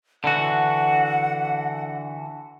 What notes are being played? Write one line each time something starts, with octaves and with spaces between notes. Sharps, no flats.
D3 E3 F#4 F#5